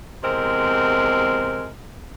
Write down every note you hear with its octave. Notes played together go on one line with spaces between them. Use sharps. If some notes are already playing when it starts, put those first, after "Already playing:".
E2 C3 G#3 C4 A#4